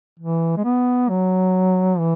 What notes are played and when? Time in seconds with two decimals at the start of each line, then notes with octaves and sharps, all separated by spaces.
0.19 E3
0.57 G#3
0.64 B3
1.09 F#3
1.99 E3